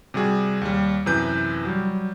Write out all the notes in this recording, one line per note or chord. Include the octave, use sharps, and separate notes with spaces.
C3 G3 F#4 G#4
D#2 G3
F#2 C3 E3 B4 G6
F#3 G3